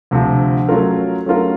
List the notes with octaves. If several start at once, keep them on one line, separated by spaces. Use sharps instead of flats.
D2 C3 F3
F#3 A3 C#4 F4 A#4
F#3 A3 C#4 F4 A#4